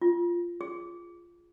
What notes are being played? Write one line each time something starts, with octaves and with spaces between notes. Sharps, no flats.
F4
G#4